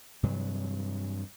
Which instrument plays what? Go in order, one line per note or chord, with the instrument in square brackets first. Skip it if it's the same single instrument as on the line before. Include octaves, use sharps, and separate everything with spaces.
[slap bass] G2 C3 E3 F#3